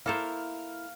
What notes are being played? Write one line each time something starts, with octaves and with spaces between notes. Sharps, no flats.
A#3 E4 A4 A#4 C5 F5